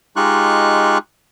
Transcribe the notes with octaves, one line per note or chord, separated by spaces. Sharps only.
G#3 D#4 F4 G4 C#6 F#6